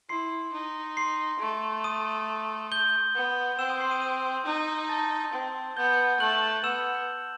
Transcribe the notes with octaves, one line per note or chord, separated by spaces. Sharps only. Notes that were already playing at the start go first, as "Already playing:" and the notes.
E4 C6 C7
D#4
C6 C7
A3
D#6 D#7
G6 G7
B3
C4 E6 E7
D#6 D#7
C6 C7
D#6 D#7
D#6 D#7
D#4
A5 A6
C4
B3 G6 G7
A3 F#6 F#7
B3 E6 E7